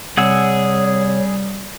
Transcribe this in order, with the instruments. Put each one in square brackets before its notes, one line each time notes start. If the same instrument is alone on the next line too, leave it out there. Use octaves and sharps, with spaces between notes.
[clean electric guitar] C3 [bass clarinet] G3 [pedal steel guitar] G#4 F#5 E6 [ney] C#5